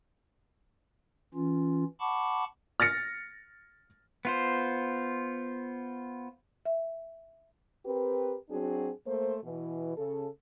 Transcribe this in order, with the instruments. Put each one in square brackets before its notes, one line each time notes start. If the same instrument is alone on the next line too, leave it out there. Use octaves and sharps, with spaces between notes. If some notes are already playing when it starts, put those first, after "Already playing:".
[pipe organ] E3 C#4 F4
F#5 A5 B5 C#6 D6
[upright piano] F6 A6 A#6 C#7
[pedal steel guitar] B3 F4 C5
[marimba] E5
[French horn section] C4 G4 A#4 B4
F#3 C4 D4 F#4 G#4
A3 A#3 C5
B2 E3
C#3 A4